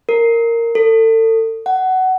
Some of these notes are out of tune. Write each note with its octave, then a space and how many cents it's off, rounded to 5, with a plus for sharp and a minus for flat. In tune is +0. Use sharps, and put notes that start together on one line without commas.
A#4 -10
A4 +35
F#5 +15